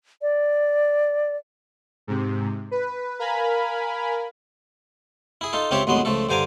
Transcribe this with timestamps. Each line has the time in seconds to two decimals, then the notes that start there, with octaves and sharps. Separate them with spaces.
0.22 D5
2.07 G#2 C3
2.71 B4
3.19 A#4 F5 G#5 B5
5.41 E4 G#4
5.53 D#4 F4 A4
5.71 C#2 C4 F4 G4 C#5 E5
5.87 A1 D#2 F#3 G#3 B3 C6
6.05 C#2 F3 A3 A4
6.29 G2 D3 C5 G#5 A#5 D6